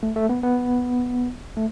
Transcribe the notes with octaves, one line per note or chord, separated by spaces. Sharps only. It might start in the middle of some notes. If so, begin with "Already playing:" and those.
A3
A3
B3
B3
A3